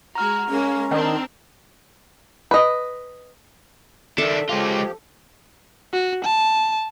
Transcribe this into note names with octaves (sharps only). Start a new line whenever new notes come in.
G#3 F#4 A#5 F6
G#3 A#3 C#4
D#3 C4 D4
B4 D#5
D#3 D4 A4 E5
F3 G#3 F4 G4
F#4
A5